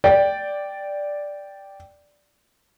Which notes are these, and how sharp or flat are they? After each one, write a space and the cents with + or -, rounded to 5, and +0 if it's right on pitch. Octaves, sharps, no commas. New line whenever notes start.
D5 +0 G5 +0